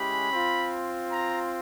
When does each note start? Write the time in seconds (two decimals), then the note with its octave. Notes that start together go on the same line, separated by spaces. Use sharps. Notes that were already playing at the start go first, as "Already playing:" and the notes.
Already playing: G#3 C#4 E4 G4 B5
0.33 C4 F4
1.11 A#5